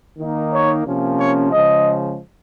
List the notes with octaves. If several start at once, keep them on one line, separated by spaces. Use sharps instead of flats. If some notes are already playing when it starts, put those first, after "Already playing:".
D#3 A#3 D#4
C#5
C3 F3 A#3 C#4
C#5
C#3 F3 G#3 D#5